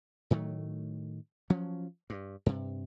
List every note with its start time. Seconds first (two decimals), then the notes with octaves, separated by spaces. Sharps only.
0.30 A2 D#3 F#3 A3
1.50 F3 F#3 C#4
2.10 G2
2.46 G2 C3